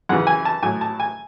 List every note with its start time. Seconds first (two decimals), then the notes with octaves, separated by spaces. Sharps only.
0.09 F#2 C#3 E3 F#5
0.27 G#5
0.45 A5
0.63 A2 F#3 G#5
0.81 A5
1.00 G#5